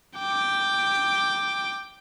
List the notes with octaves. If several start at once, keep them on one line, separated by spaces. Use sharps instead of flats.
G5 D6